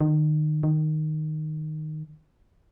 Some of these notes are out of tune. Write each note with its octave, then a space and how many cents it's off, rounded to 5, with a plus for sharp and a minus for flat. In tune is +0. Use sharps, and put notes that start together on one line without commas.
D#3 -30
D#3 -10